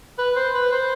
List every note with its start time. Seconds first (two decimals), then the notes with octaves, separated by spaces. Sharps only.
0.18 B4
0.36 C5
0.54 B4
0.72 C5